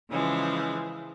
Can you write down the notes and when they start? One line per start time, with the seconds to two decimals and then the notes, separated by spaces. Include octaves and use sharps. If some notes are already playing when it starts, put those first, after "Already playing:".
0.10 C#3 E3 F3 G#3